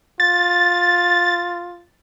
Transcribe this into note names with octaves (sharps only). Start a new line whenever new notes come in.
F4 A6